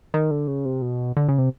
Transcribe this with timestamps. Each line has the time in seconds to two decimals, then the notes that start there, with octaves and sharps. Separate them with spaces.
0.14 D#3
0.31 D3
0.48 C#3
0.65 C3
0.82 B2
1.17 D3
1.28 C#3
1.38 C3